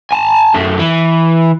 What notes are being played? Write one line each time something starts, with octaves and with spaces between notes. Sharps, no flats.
G#5 A5
F#2 A3
E3